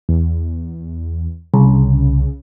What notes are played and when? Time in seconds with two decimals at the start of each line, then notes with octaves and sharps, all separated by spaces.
0.09 E2
1.54 C2 C#3